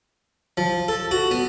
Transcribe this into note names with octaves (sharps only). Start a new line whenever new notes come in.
F3
A4
F#4
B3